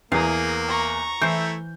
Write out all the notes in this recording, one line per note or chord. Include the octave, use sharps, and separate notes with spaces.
E2 E3 A#3 G#4 F5 A#5
A#5 C#6
E3 A3 E4 C5 G6